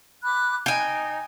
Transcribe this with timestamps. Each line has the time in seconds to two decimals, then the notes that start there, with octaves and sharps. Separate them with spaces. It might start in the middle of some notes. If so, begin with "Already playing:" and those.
0.23 B5 D6 F#6
0.66 D#4 G5 G#5